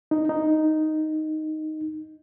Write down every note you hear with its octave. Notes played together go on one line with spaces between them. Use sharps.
D#4
D#4